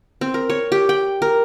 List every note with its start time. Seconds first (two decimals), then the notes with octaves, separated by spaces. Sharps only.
0.21 C4
0.34 A#4
0.50 C#5
0.72 G4
0.89 G5
1.22 A#4